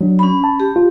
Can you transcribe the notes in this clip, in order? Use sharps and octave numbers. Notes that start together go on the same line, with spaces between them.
F#3 D4
C#4 B5
A5
G4
F4